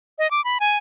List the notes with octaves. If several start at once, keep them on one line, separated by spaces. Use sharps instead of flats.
D#5
D6
B5
G#5